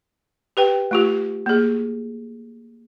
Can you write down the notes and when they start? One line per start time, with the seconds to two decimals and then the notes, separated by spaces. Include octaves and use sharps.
0.57 G4 B4 G5
0.91 A3 F4 G4
1.46 A#3 G#4